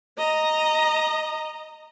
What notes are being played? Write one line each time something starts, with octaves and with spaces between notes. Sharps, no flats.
D#5 A#5